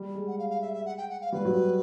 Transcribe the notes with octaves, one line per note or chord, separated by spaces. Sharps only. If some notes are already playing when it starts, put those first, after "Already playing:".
Already playing: G3
G#3
F#5
F5
F5
E5
E5
F#5
G5
F#5
F5
G3 B4
F#3